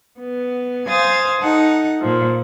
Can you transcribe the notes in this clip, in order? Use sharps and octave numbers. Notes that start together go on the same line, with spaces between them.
B3
C5 F5 G#5 D#6 G#6 A6
D#4 A4 F#5
A#2 F3